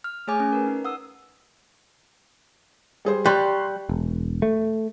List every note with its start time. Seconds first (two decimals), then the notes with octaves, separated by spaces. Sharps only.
0.04 F6
0.27 A3 G#4 C#5 G#5 D6
0.40 C#4
0.52 A#4 B4
0.67 D#4
0.85 F#5 D#6 E6
3.05 G3 G#4 C5
3.26 G3 C6 C#6 F#6
3.89 E1
4.42 A3